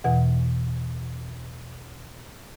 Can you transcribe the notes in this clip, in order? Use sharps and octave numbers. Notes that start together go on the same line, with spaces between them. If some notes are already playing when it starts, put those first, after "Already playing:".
E2 B2 E3 F#5